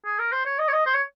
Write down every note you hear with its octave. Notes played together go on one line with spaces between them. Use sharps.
G#4
A#4
C5
C#5
D#5
C#5
D#5
C5
C#5